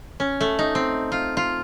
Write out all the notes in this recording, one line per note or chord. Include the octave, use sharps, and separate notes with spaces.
C#4
A3
D#4
C4
F4
F4